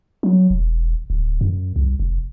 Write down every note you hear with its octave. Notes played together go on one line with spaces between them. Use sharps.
F#3
E1
D1
F#2
C2
F1